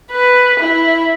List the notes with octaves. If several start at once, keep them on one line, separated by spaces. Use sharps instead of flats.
B4
E4